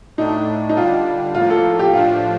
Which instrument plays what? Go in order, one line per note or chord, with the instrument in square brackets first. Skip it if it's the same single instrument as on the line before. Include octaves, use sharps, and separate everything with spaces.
[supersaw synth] A2 A3 D4 [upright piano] D#4
[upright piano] D#4
[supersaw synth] D3 G3 D4 [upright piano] F4
[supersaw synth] A2 F3 A#3 [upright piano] F4
[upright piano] A4
G4
[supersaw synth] A2 F3 A3 D4 [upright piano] F4